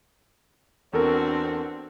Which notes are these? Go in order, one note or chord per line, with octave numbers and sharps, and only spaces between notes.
E2 C4 D4 F#4 A4 A#4